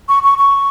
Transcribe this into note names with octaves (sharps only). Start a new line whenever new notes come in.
C#6
C#6
C#6